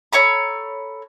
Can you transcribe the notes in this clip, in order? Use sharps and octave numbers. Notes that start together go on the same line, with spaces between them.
A4 C#5 A#5 B5